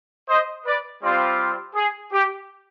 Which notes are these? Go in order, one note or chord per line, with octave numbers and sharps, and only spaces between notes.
C5 D#5
B4 D5
G3 C4 F4
G#4
G4